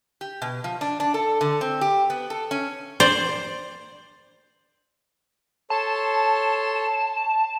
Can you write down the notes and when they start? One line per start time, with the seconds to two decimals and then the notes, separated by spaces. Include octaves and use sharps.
0.21 G4
0.42 B2
0.64 F3
0.81 D4
1.00 D4
1.14 A4
1.41 D3
1.61 C4
1.81 G4
2.10 B3
2.30 A4
2.51 C#4
3.00 C5 D5
5.70 A4 C#5 A5 C6